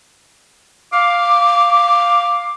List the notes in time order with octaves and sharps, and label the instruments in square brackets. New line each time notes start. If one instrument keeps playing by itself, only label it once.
[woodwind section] F5 D6